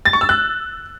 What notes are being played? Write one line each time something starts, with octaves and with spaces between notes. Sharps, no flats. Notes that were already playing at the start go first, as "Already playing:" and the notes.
A6
C#6
E6
F#6